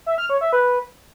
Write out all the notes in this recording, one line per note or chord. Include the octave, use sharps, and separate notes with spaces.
E5
F6
C#5
E5
B4